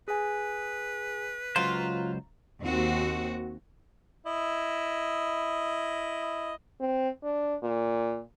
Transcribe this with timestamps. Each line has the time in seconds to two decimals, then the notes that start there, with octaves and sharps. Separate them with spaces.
0.08 G#4 B4 G#5
1.56 C#2 F#3 F4 C5 A#5
2.63 D#2 C4 F#4
4.26 E4 D#5
6.81 C4
7.24 D4
7.63 A#2